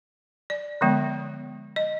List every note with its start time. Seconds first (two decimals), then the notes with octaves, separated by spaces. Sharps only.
0.50 D5
0.81 D3 F3 G#3 B3
1.76 D#5